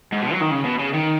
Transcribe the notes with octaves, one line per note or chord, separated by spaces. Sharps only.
G#2
B2
F#3
D#3
C#3
B2
C#3
D#3